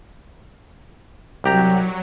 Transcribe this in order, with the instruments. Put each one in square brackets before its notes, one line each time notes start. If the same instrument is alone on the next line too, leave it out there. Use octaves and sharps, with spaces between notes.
[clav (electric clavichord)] C2 G4 A#5 [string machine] F#3